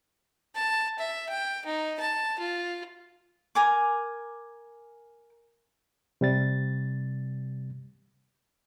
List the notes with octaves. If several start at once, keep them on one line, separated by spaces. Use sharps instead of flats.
A5
E5
G5
D#4
A5
F4
A#4 G#5 D6
C3 G3 A6